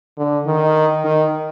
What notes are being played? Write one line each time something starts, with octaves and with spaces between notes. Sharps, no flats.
D3
D#3
D#3